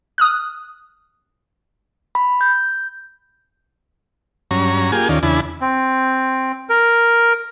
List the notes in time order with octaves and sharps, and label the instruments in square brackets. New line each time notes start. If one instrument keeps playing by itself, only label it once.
[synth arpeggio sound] D#6 F6 F#6
[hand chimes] B5
G6
[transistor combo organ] G2 F#3 C#4 A#5 C#6
A#3 F4 G4 G#4 G#5
D#2 D#3 C#4 F4 D5
E2 C#3 D4 E4 G#5 B5
[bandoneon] C4
A#4